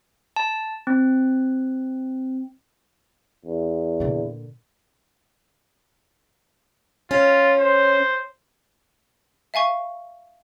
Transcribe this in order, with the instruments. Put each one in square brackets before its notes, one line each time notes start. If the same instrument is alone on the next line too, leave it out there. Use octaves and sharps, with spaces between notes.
[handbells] A5
C4
[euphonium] E2
[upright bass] A#2 D3
[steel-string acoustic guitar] C#4 [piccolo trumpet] F4
[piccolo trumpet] C5
[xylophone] E5 F5 G#5 C#6